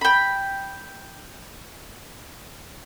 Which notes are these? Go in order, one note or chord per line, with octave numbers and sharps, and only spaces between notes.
G5 B5